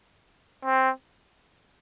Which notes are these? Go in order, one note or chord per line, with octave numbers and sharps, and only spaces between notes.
C4